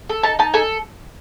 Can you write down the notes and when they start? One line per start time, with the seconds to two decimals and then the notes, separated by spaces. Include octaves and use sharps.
0.09 A4
0.23 D#4 A5
0.39 D#4 A5
0.54 A4 G#5